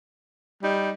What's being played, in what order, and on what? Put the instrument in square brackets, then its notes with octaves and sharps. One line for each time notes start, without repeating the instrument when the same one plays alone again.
[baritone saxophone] G3 [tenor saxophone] D#4